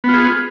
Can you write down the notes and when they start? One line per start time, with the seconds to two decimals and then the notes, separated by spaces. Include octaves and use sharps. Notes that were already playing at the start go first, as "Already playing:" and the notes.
0.04 B3
0.09 F4
0.14 G#4